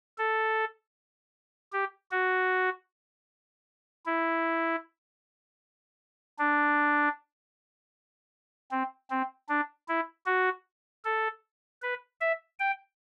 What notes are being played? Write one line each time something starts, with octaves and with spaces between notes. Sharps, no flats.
A4
G4
F#4
E4
D4
C4
C4
D4
E4
F#4
A4
B4
E5
G5